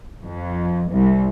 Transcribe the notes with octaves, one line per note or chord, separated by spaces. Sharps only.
F2
C2